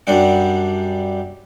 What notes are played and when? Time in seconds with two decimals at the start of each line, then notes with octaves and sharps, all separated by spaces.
0.07 F#2 G3 D4 F#5